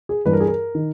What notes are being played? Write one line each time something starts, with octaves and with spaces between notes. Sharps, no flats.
G#4
G2 E3 B4
A#4
G#4
A#4
D#3